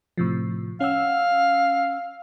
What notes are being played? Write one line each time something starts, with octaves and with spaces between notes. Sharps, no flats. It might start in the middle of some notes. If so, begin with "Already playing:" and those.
A2 C3 F3
C#4 F5 F#5 E6